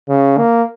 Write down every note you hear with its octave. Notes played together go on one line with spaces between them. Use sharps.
C#3
A#3